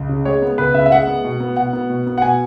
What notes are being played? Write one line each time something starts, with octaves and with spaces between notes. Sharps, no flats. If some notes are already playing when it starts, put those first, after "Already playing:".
Already playing: C#2
C#3
G#3 C#5
B3
C#2 B4
C#3 E5
E5
G#3 F#5
B3
B2
B3
B2 F#5
B3
B2
B3
F#5
B2 G#5